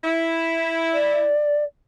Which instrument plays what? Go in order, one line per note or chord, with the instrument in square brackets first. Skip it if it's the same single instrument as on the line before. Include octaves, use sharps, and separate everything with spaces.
[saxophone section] E4
[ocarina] D5